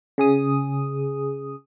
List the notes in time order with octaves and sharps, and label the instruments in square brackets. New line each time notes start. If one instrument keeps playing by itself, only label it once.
[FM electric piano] C#3 G#4 D#6